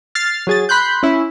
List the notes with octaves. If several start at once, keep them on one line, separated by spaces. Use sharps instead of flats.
F6 A6 C7
F#3 G#4 A6
B5 C6 F#6 G6
C#4 E4